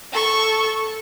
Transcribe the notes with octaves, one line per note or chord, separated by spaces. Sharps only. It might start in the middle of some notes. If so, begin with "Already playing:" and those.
A4 C#6